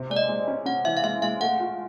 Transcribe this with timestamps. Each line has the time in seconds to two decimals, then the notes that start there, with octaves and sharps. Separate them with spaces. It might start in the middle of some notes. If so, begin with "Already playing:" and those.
Already playing: C3
0.10 G#3 D5
0.16 D#5
0.28 G#3
0.48 C#4
0.66 C#4 F#5
0.85 E3 E5
0.97 F5
1.04 G#3 E5
1.22 G#3 F5
1.41 A3 F#5
1.60 F4